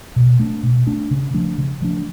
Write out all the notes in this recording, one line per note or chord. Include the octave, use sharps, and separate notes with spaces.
B2
A3 D4
B2
A3 D4
C#3
F3 A3 D4
C#3
F3 A3 D4